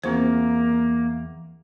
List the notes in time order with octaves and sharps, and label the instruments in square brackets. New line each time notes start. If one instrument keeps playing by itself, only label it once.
[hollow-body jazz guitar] E2 [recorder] A#3 [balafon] C4 F4 C5